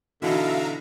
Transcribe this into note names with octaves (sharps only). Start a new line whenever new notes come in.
B2 D3 E3 D#4 F#4 E5 F5 A#5